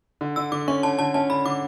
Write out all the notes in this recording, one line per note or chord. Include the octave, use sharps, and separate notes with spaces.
D3
D3 E6
D3 D6
C#4 C#6
D3 A5
D3 A5
C#4 A5
D3 B5
D3 D6